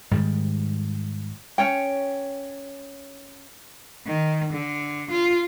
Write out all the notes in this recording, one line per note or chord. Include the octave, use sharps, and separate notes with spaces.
G#2 D#3 G3
C#4 C#5 G5
D#3
D3
F4